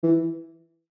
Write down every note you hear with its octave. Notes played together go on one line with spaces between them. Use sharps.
E3